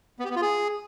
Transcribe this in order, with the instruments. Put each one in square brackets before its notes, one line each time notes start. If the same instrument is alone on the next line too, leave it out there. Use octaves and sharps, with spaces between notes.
[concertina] B3
G4
B3
F4
G#4